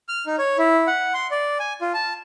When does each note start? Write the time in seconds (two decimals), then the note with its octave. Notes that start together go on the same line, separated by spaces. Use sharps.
0.09 F6
0.26 D#4
0.38 C#5
0.58 E4
0.87 F#5
1.14 C6
1.31 D5
1.60 G#5
1.81 F4
1.94 A5